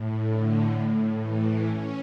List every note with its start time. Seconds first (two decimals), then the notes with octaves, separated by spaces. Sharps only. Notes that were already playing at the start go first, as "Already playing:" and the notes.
Already playing: A2
0.26 D3
0.74 A2
1.20 E3
1.68 C#4